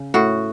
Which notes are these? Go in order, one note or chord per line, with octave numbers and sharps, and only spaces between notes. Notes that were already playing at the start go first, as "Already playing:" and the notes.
Already playing: C#3
A2 F#4